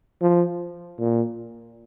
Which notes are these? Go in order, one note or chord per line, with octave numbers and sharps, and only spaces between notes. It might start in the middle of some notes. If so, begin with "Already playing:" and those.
F3
A#2